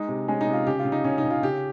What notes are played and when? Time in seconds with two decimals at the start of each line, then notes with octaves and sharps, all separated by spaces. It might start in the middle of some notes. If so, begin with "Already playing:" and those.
Already playing: G#3 D#4
0.08 C3
0.28 G#3 C#4
0.41 D#4
0.47 C3
0.53 F4
0.67 C#3 G4
0.79 F4
0.85 C#3
0.92 D#4
1.04 C#3 C#4
1.18 D#4
1.24 C#3
1.31 F4
1.43 C#3 G4